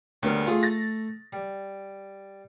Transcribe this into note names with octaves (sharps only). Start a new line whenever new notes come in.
D2 G3 A#3 B3 C#4
A3 F4 G#4
A6 A#6
G3